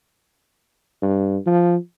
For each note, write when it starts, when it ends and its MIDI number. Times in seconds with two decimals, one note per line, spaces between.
1.02 1.37 43
1.46 1.76 53